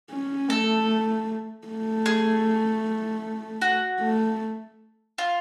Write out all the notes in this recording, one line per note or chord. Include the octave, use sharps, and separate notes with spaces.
C#4
A3 A4
A3
G#4
F#4
A3
F4